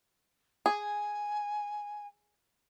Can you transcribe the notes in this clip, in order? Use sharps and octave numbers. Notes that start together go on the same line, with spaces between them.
G#4 G#5